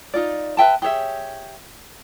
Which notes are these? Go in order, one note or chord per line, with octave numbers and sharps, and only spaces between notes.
D#4 F4 D5
B4 E5 G5 A5
G4 G#4 C#5 E5